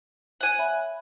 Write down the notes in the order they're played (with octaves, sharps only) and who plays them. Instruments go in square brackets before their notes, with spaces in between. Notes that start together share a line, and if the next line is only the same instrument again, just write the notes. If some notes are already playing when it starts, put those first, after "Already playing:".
[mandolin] F#5 G#5
[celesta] C#5 E5 B5